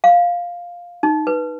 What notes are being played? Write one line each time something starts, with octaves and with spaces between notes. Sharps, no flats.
F5
D#4
B4